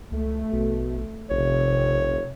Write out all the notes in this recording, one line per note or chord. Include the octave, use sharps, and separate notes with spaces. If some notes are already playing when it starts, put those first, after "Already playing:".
C#2 A3
A#1 B2
F1 A#1 C3 C#5